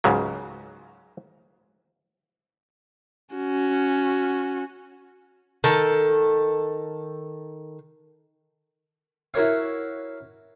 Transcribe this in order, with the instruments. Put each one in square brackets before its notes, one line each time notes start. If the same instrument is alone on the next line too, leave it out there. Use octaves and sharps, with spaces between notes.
[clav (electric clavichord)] C#2 G#2 C#3 F#3
[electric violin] C#4 F#4
[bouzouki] D#3 A4
[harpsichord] E4 F#4 A#4 C#5 F5